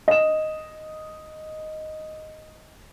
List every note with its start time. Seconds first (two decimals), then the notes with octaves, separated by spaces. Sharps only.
0.08 D#5 E7